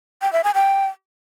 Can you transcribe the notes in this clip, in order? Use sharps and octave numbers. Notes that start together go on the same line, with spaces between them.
G5
E5
G#5
G5